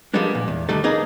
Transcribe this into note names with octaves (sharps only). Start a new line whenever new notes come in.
F3 G3 G#3 A#3 B3 D4
A#2
E2
D3 D#3 G3 A3 A4
A#3 D#4 G#4 B4